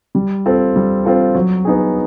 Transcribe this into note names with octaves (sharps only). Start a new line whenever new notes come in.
G3
C4 F4 A4
G3
C4 F4 A4
F#3
B3 D#4 G#4